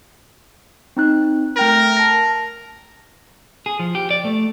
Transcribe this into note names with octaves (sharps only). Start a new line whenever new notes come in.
C4 D#4 F#6
A3 A#4 G5 A#6
A5 A#6
G#4
F3
G4
D5
A3